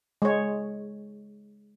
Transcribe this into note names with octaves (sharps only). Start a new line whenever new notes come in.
G#3 C#5